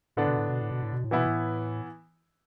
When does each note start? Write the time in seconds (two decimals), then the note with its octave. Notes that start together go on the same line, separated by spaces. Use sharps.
0.17 A2 D3 B3 D4
0.28 B2
0.38 A2
0.49 B2
0.61 A2
0.71 B2
0.82 A2
0.93 B2
1.04 A2
1.11 B2 E3 B3 E4
1.26 A2